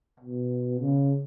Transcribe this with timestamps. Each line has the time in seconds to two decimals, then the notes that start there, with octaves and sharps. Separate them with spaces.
0.20 B2
0.80 C#3